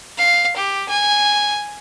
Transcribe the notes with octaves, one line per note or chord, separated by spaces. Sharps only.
F5
G4
G#5